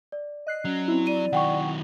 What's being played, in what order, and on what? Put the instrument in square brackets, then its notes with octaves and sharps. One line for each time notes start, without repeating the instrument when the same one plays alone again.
[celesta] D5
[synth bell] D#5 F#6 C7
[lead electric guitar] F#3 [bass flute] C#4
[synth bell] C4 E4
[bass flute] D5 [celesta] D#7
[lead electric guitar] D#3 F#3 [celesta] F#5 G5 C#6